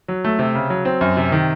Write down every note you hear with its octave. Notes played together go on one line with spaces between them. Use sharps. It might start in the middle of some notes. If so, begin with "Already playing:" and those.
F#3
A3
C3
C#3
F#3
C4
F#2
C3
D#3